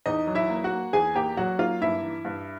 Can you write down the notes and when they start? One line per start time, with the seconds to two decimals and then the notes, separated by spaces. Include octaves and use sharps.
0.06 E2 D#4 D#5
0.27 F#3
0.35 E4 E5
0.49 A#3
0.64 F#4 F#5
0.71 A#3
0.93 E2 G#4 G#5
1.15 A#3 G4 G5
1.37 F#3 F#4 F#5
1.59 A#3 F4 F5
1.81 G2 E4 E5
2.03 E3
2.25 G2